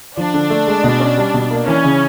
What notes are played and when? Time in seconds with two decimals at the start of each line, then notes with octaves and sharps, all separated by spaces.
0.17 F3 D4
0.34 D3
0.50 A3
0.67 G#3
0.84 B2
1.00 C#4
1.17 G3
1.34 B2
1.51 A#3
1.67 E3 C#4
1.84 C#3